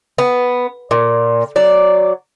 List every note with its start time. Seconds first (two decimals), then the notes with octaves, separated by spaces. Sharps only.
0.18 B3
0.91 A#2
1.56 F#3 D5